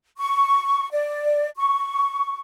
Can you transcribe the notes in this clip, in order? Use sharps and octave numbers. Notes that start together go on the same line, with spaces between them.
C#6
D5
C#6